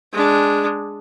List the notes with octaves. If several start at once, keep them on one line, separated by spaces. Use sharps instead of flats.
G#3 D4